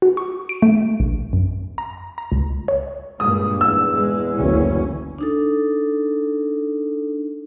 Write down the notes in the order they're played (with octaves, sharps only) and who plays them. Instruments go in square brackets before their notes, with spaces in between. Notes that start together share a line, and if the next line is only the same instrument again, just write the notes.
[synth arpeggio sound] F#4
C#6
D7
A3
A#1
F#2
A#5
A#5
C#2
C#5
[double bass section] G2 A#2 [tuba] G#3 [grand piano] D#6
[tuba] E2 [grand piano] E6
[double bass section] G#3
F#1 D2 C#4
[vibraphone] D4 D#4 A4